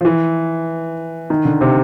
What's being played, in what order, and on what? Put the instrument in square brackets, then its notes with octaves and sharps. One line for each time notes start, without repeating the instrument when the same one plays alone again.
[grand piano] F3
E3
D#3
D3
C3